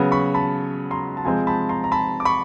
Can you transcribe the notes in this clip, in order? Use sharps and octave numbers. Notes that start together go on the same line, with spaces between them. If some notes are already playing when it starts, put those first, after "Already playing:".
Already playing: C#3 F#3 B3
B5 C#6
A5 B5
A#5 C6
A5
C3 F3 G#3 C4 G#5 A#5
A5 B5
A#5 C6
A#5
A5 B5
D6
B5 C#6